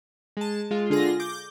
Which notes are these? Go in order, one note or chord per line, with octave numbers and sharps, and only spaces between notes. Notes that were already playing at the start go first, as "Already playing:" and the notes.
G#3 A5
G#3 F4
D3 F4 G#4 A#6
D6 G6